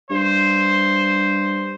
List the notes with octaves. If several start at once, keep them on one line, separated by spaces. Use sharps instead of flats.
G2 C5